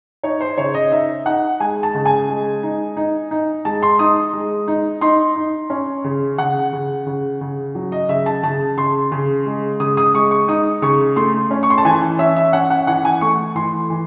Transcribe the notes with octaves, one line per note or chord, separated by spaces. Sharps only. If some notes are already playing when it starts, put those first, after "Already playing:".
D#4 C#5
C5
C#3 C#5
D#5
D#4 E5
D#4 F#5
G#3 G#5
A5
C#3
G#5
G#3
D#4
D#4
D#4
G#3 A5
C6
D#4 D#6
G#3
D#4
D#4 C6
D#4
C#4
C#3
C#3 F#5
C#3
C#3
C#3
F#3
D#5
C#3 E5
A5
C#3 A5
C#3 C6
C#3
G#3
C#3 D#6
D#6
G#3 C#6
C#6
D#4 D#6
C#3 C#6
A3 C6
C#4
C#6
C6
A5
E3 G#5
G#5
C#4 E5
E5
C#4 F#5
F#5
E3 F#5
G#5
A3 C#6
E3 C6
E3